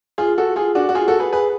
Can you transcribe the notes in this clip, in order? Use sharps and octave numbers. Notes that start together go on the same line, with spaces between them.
F4 G#4
F#4 A4
F4 G#4
D4 F#4
F#4
F4 G#4
F#4 A4
G#4 B4
G#4 B4